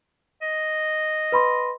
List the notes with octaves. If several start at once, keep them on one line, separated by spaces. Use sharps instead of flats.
D#5
B4 B5 C6